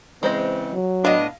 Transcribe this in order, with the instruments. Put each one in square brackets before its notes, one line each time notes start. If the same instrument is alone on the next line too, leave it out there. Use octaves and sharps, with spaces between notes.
[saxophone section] C#3 E3 C4 [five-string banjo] G#3 C5 D#5
[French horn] F#3
[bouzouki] A2 D#5 [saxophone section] B3 D4 [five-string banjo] F5